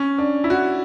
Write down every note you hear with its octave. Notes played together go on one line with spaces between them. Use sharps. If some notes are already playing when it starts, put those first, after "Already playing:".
Already playing: C#4
D4
E4
F#4